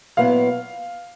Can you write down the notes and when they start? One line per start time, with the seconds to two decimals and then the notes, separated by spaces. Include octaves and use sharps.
0.17 A#2 F#3 B3 E4 F5